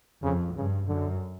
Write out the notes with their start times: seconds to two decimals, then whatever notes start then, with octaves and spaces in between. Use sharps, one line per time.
0.23 F2 C#3
0.56 G2 C#3
0.88 F#2 D3